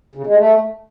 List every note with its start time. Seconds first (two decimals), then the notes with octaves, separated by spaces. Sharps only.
0.15 C#3
0.27 G#3
0.38 A3